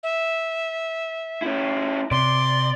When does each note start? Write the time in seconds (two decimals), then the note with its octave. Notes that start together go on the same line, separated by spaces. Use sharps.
0.03 E5
1.42 C#4 E4
2.11 C3 D5 C6